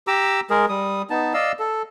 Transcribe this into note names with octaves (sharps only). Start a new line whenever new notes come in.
G4 A#5 D6 E6
G#3 G#4 A#4
G3 D#6
B3 D#4 A5
D5 D#5 F5 E6
A4